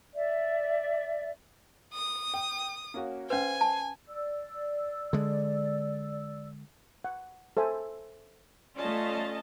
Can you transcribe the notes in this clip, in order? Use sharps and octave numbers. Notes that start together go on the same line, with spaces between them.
D5 E5
D#6
G5
A#3 C#4 F#4
C#4 B4 C5 F5 G#5
A5
D5 E6
D3 G#3
F#5
A4 C5 E5 G#5
A3 C#4 F4 D5 D#5 A5